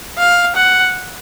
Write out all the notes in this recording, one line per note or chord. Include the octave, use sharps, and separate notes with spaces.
F5
F#5